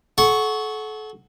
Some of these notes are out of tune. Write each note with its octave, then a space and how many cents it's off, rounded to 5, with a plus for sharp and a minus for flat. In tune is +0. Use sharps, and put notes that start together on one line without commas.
A4 -35 F#5 +0 C#6 +0